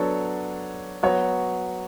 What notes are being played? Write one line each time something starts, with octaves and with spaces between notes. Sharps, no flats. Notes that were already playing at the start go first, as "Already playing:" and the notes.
Already playing: F#3 B3 D4 A4 C#5
F#3 B3 F#4 C#5